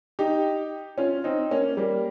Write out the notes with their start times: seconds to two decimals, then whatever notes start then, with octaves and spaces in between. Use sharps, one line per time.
0.19 D#4 G4
0.98 C#4 F4
1.24 C4 D#4
1.51 A#3 C#4
1.77 G3 A#3